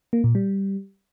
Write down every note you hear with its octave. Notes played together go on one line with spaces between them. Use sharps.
A#3
A#2
G3